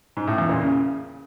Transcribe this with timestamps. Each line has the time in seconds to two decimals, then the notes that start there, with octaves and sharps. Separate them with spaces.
0.17 G#2
0.27 A2
0.38 E2
0.49 A#2
0.60 C#3